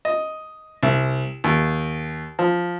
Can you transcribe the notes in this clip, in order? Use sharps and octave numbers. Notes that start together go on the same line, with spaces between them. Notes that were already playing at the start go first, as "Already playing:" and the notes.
D#5
C2
D#2
F3